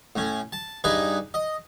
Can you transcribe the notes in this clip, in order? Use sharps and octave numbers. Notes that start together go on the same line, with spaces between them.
A2 C#4
A5
G2 D#4 G#4 B4
D#5